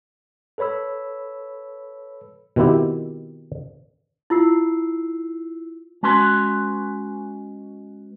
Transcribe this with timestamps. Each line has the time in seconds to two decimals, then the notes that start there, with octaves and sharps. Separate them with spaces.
0.58 A4 B4 C#5 B5 E6
2.56 B2 D#3 C4 E4 G4
4.30 E4 F4 E6 C7
6.03 G#3 C#4 F#4 B4 C6